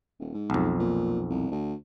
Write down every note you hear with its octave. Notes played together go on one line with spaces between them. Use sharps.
D#1
G#2
B1 F2
A#2
C2
D2